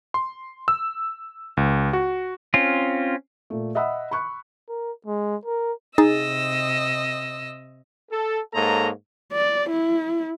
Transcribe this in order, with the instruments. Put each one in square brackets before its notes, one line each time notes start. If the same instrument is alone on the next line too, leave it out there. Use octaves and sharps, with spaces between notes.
[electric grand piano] C6
E6
C#2
F#4
[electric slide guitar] C4 C#4 F4
[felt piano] A#2 A3
D#5 E5 F#5 B5 D#6 E6
B5 C#6 F#6
[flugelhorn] A#4
G#3
A#4
[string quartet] C3 D#5 E6 [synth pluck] D#4 G#4 A6
[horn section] A4
G#2 A#3 A4 C#5 D#5 A#5
[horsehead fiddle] D5
E4